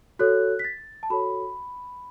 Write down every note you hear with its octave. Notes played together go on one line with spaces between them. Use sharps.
F#4 A4 C#5 F#6
B6
A6
A5
F#4 A4 C#5 B5